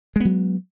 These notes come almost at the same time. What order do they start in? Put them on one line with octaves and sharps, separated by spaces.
G#3 B3 F#3